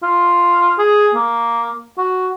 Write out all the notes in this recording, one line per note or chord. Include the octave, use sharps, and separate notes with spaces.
F4
G#4
A#3
F#4